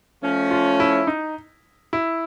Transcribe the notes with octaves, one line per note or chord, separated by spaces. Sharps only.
F3 A3 C#4
F4
E4
D#4
E4